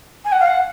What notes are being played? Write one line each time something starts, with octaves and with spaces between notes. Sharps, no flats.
G#5
F#5
F5
F#5